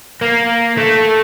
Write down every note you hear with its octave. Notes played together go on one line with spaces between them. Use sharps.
A#3
A3